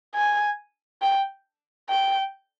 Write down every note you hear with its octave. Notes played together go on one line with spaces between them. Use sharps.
G#5
G5
G5